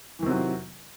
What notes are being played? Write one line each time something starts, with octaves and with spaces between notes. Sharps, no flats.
C3 D#3 E3 F#3